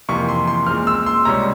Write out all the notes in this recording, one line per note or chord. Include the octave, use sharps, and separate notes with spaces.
F2 C3 E3 A#3 C#6
C6
C6
A#2 G#3 C4 F6
E6
C6
C#2 C3 G3 C#4 A#5